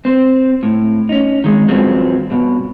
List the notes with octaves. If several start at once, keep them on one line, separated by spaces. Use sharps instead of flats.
C4 C5
A2
C#4 D#4
D#3 G#3
G2 F3 F#3 C4
B1 G2 B2